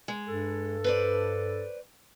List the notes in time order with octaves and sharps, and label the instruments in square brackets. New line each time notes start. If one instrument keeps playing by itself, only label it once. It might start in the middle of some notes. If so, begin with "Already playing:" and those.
[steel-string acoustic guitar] G#3
[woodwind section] G2 A4
[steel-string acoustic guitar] B4 C5 D5